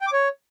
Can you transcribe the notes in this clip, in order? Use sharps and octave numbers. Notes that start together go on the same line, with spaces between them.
G5
D6
C#5